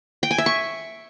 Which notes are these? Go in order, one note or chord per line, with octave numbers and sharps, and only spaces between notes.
G5
G#5
E5
C#6